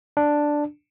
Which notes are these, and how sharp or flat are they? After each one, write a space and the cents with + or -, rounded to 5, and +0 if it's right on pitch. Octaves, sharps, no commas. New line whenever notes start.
D4 +0